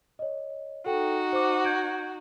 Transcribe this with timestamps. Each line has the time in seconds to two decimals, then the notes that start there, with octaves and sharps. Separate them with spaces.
0.19 C#5 D#5
0.86 D#4 F#4 A4 G5
1.33 C5 D6
1.64 G6 G#6 D7